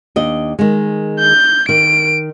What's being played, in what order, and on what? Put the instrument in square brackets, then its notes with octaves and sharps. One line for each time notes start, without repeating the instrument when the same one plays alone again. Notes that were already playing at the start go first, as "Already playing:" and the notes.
[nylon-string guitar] D#2 D4 D#5
D#3 G#3
[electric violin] G6
[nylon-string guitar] D#3 [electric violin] D7